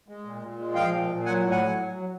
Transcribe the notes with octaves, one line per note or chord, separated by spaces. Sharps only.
G#3
A#2
A#2
G#3
F3 F5 G5
A#2
A#2
F#3 F#5 G#5
A2
F#5 G#5
F#3
F#3
F#3